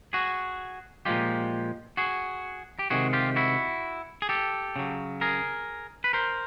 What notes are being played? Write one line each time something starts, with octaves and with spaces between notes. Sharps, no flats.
F#4 G#4
A#2 F3 G#3 F4 G4
F#4 G#4
G4
C3 D#3 G#3 F#4 G#4
F4 G4
E4 F#4
G#4
G4 A4
C#3 F#3
G#4 A#4
B4
A#4 C5